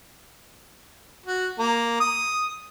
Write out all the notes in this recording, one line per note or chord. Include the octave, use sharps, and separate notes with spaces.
F#4
A#3
D#6